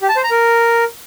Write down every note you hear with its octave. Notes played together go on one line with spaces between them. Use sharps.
G4
A5
C5
A#5
A#4